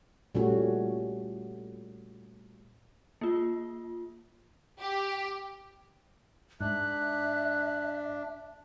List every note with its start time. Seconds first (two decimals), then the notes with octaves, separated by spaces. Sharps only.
0.35 A#2 G3 A3 C#4 F#4
3.21 A#3 F4
4.79 G4
6.61 G#2 D4 E5 F#6